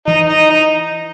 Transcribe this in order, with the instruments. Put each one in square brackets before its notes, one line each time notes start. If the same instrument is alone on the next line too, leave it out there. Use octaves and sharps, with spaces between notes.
[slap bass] E3 [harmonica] D#4
[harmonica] D#4
D#4